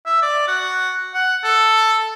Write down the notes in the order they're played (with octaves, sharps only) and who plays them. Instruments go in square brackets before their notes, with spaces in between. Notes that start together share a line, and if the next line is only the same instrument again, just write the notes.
[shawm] E5
D5
F#4
F#5
A4